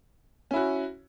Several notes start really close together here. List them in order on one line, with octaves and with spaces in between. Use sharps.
C#4 E4 F#4